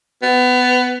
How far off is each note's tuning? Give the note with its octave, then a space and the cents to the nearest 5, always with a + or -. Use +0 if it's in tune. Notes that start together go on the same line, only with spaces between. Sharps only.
B3 +20